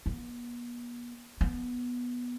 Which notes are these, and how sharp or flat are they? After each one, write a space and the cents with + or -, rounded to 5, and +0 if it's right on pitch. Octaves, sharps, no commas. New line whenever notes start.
B3 -45
B3 -10